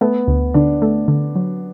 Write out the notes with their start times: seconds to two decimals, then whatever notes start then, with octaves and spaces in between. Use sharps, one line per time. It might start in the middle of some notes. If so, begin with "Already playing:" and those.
0.01 A3 B3
0.28 D2
0.54 D3 D4
0.82 A3
1.08 D3
1.35 F#3